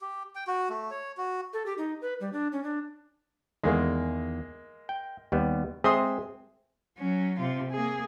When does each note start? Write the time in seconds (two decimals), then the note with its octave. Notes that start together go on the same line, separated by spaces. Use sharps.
0.01 G4
0.35 G5
0.47 F#4
0.70 A3
0.91 C#5
1.17 F#4
1.53 A4
1.66 G4
1.78 D#4
2.02 B4
2.20 G3
2.33 D4
2.52 C#4
2.64 D4
3.63 E2 D#3 G#3 A#3
4.89 G5
5.32 D#2 G3 B3
5.84 G#3 C4 G#4 E5 C6 D#6
6.98 F#3 C#4
7.40 C3 F4
7.71 A#3 G#4